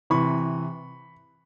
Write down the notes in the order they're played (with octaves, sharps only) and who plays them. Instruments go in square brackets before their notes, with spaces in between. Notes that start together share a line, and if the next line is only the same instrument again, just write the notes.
[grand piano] C3 E3 B5 C#6